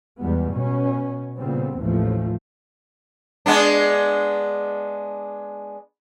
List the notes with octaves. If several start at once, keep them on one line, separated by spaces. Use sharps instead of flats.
E2 G3 G#3 B3
B2 C#4
A#2 C#3 G3 B3 C4
A1 D#2 E3 F3 A3
G#3 B3 D4